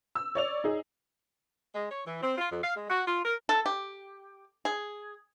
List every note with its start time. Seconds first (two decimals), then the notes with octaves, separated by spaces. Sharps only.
0.15 E6
0.35 C#5 D5 F7
0.64 D#4 G#4
1.75 G#3
1.90 C#5
2.06 E3
2.22 C4
2.38 F4
2.51 F2
2.64 F5
2.76 G#3
2.90 F#4
3.07 F4
3.25 A#4
3.49 A4
3.66 G4
4.65 G#4